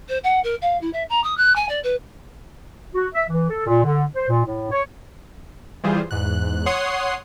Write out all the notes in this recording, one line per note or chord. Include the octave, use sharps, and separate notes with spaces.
C5
F#5
A#4
F5
E4
E5
A#5
D#6
F#6
G#5
D5
B4
F#4
E5
E3
A4
A#2
D3
C5
A#2
A2
C#5
E3 G3 F4 G#4 C5
E2 G#2 F#6
C#5 F#5 C6 D#6 C7